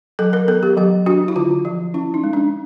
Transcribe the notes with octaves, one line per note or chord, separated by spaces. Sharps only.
F#3 A4
A#4
B3 A4
G4
F#3 G4
D4 F#4
E4
D3 F4
F3
C#4 E4
D#4
G#3
D4